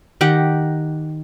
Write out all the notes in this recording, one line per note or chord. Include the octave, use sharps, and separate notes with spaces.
D#3 G4 F#5